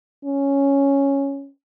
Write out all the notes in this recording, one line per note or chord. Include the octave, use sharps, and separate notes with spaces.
C#4